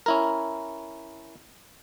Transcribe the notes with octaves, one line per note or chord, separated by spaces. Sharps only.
C#4 E4 A#4